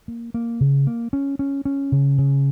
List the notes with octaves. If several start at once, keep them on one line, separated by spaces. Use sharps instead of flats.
A#3
A#3
C#3
A#3
C#4
C#4
C#4
C#3
C#3